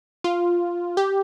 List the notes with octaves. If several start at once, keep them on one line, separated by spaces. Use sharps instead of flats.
F4
G4